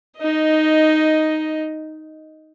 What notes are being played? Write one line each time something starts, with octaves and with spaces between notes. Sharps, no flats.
D#4 D#5